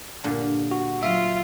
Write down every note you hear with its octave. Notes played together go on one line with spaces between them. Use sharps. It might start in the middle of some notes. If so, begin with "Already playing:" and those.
G2 A#2 D3
F#4
F#3 F4 E5